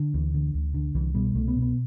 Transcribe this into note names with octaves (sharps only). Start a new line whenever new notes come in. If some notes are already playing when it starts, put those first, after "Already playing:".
Already playing: D3
D2 E3
D3
D2
D3
C2 E3
B2 G3
C2 A3
B3
B2
B3